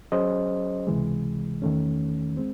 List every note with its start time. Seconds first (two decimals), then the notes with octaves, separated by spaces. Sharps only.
0.12 F#3 C#4 G#4 C5 D#5
0.87 C#2 C3 E3 G#3
1.62 E2 D#3 A3 C#4
2.37 G#3 C4